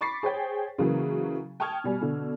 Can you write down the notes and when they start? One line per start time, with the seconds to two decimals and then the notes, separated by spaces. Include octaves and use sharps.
0.01 B5 C#6 D6 A6 B6 C7
0.23 G#4 C5 C#5 G5
0.78 C#3 E3 F#3 A#3
1.60 G5 A5 C#6 D#6 F6 G#6
1.84 B2 G3 G#5
2.01 B2 D3